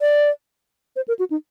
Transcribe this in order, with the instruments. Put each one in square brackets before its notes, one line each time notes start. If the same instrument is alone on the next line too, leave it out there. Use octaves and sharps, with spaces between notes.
[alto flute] D5
C5
A#4
F#4
D#4